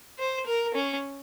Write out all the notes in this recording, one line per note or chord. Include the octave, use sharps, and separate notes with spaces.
C5
A#4
C#4